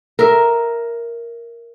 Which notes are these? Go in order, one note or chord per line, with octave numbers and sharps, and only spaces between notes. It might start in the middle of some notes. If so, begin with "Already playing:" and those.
A#4 E5